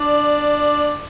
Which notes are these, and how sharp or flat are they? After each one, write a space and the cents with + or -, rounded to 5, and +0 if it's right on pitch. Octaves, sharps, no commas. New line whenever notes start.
D4 +0 D5 +15